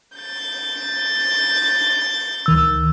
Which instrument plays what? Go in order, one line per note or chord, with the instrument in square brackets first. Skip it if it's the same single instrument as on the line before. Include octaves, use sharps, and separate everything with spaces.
[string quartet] G6 A6
[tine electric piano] C#2 D#3 E6